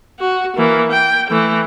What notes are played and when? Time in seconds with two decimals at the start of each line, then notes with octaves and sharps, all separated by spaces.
0.19 F#4
0.57 E3 A#3
0.91 G5
1.30 E3 A3